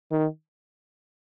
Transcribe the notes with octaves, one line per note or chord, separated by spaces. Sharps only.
D#3